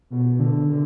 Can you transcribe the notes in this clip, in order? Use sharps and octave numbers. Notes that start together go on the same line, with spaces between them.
B2
D3
D3